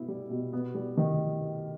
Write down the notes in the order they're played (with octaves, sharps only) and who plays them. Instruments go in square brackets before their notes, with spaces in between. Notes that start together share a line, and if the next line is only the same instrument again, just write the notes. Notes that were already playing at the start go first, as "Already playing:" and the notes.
Already playing: [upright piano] B2 B3 E4
G3
B2
B3
G3
D#3